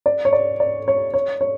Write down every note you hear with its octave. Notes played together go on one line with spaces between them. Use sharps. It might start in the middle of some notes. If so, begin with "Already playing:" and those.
D5
C#5
D5
D5
C#5
C#5
C#5